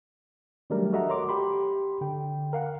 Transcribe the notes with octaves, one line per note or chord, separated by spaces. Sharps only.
D#3 F#3 G3 A3 D4 A#4
F#4 A4 D#5 E5 F#5 A#5
C#5 A#5 C6 D6
G4 B5 C6
D3 G5
A#4 F5 F#5